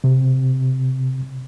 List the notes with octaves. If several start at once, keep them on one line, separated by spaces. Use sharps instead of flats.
C3